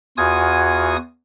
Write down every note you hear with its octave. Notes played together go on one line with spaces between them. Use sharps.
E2 F4 F#4 G#5 D#6 G#6